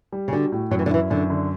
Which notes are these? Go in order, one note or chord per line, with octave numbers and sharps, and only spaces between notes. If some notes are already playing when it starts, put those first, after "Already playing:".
G3
C#3
D3 F#4
A2
F#2 F#3
E3
D3
E3 E4
F#2 D3
D3